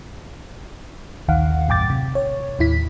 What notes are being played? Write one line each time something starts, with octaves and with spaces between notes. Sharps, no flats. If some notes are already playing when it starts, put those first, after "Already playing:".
A#1 D#2 D#3 F5 F#5
A#1 F#2 A2 G5 D6 A6
C3
C#5
D#2 A2 E4 B6